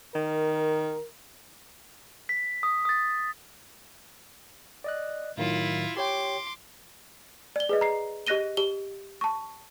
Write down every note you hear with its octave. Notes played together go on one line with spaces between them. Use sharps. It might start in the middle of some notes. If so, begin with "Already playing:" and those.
D#3 A#4
B6
D#6
D#6 A6
D5 D#5 F#6
A2 D#3 F#3 E4 F4
G4 C#5 G5 C6 D6
D5 G7
G#4 B4 D#5
A#5 C7
G4 D#5 F#6 A#6 D#7 G7
G4 G7
A5 C#6